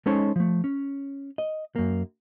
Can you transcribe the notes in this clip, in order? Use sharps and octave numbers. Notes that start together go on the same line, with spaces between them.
G#3 C#4 D#4 A4 C5 C#5
F3 A3
C#4
D#5
F#2 A#3